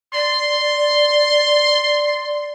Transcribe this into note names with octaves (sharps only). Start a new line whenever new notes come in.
D5 C6